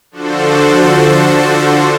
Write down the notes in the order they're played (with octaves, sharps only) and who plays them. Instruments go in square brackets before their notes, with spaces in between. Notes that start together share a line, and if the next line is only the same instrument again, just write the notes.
[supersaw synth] D3 F3 D4 F#4 A4 C5